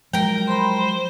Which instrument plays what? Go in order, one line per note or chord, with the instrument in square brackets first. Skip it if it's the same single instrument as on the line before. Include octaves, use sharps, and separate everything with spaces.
[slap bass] F3 F#3 G#3 [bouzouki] A#4 G5
[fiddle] C5 [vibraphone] B5 C6